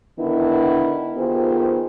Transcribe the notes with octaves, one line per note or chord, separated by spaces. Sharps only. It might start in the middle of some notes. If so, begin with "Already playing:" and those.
D3 D#3 B3 D4 E4
D#3 B3 F4 G4 G#4 C5